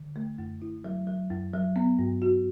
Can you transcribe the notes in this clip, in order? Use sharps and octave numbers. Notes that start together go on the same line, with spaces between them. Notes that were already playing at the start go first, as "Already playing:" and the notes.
Already playing: D3
A3
F#2
E4
F#3
F#3
F#2
F#3
B3
G2
F#4